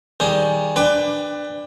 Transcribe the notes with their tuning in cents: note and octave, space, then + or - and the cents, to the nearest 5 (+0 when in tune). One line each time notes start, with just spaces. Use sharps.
D#3 +20 G3 +0 G#4 +10
D4 +10 B4 +20 G5 +35